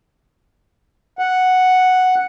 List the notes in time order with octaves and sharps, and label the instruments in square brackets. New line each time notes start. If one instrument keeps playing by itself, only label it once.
[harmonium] F#5